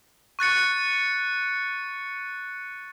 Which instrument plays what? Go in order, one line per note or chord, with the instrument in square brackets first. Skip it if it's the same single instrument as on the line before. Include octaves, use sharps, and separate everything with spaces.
[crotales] C#6 F#6 A6 C#7